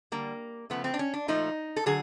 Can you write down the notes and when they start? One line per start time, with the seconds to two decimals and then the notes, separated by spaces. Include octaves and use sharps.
0.12 D3 G3 A#3
0.70 C#3 F3 A3 B3
0.84 C4
0.94 D4
0.99 C#4
1.14 D4
1.28 A#2 F3 A3 D#4
1.76 A4
1.86 D3 F#3 G#4